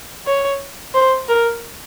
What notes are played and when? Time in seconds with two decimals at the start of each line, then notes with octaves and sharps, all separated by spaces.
0.26 C#5
0.94 C5
1.28 A#4